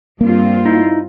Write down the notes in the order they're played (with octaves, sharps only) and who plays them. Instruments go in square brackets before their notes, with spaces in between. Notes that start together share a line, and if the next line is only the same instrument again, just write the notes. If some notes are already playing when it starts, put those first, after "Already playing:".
[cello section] G2 C4 F4 [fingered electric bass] A#3
[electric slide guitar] D#4 E4